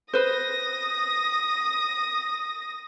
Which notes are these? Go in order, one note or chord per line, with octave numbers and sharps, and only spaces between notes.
B4 C5 D#6 A#6